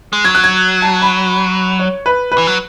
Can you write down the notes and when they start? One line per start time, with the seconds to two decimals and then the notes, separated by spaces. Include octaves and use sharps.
0.13 G#3
0.25 F#3 G#6
0.35 F#6
0.44 G#6
0.82 A5
1.02 B5
1.80 C#5
2.06 B4
2.32 B4
2.38 E3
2.47 F#3